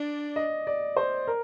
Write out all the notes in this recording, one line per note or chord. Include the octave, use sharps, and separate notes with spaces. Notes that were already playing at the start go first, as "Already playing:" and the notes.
Already playing: D4 D5
D#5
D5
C5
A#4